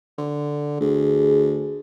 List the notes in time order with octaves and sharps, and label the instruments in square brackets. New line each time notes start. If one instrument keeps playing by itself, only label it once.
[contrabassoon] D3
[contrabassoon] D2 [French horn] G#4